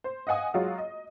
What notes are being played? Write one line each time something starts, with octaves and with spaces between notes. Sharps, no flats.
C5
D#5 F5 F#5 G#5 D#6
F#3 G#3 F4 F#4
D#5